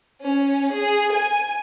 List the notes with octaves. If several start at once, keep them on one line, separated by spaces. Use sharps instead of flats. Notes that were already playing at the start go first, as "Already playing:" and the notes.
C#4
G#4
G#5